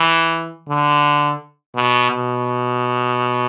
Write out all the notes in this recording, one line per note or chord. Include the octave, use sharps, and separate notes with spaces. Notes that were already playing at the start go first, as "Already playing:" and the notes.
Already playing: E3
D3
B2
B2